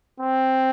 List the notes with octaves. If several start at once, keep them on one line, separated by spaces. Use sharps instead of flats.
C4